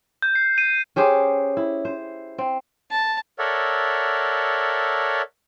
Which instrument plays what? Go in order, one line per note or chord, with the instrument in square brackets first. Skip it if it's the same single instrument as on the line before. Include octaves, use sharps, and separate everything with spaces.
[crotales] G6
C7
D#7
[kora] C#4 G4 G#4 C5
E4
C5
C4
[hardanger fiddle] A5
[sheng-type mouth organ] A4 A#4 C#5 D5 E5 F#5